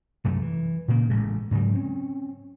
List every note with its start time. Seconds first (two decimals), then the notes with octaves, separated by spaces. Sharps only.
0.24 C2 F#2 A3
0.41 E3
0.88 A#2 C#3 A#3
1.10 A1 A2 C#3 G#3
1.51 G#2 C#3 F#3 G3
1.75 C4 C#4